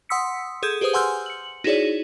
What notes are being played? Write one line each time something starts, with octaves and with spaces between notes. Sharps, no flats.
F#5 C6 D#6 E6 B6 C#7
G#4 A4 D#6 G6 G#6
G4 G#4 B4 C5 D#6
F#5 G#5 C6 E6 F6 G6
C#7 F#7
D#4 E4 F#4 G#4 C#5 D5